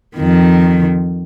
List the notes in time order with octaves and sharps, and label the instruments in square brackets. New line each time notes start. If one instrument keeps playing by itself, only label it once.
[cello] F2 D#3